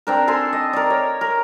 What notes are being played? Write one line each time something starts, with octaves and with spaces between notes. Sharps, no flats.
C4 D4 A#4
A4 G#5 C6
D#5
A#4 D5
C#5
A#4